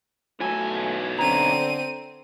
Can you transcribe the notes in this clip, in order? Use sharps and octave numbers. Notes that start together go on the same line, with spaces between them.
B1 E3 F#3 A3 A4 G#5
D3 C4 A#5 D#7